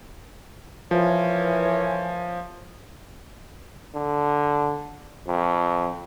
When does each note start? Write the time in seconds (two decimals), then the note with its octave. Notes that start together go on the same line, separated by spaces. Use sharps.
0.91 E3 F3 A#4 C#5
3.95 D3
5.27 F2